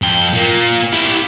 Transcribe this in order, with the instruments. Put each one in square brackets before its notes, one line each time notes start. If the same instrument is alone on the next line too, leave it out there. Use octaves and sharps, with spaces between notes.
[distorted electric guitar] F2 G5
A#2 A#3
E4 G4